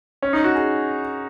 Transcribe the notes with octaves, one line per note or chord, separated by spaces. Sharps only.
C#4
D#4
F#4
G#4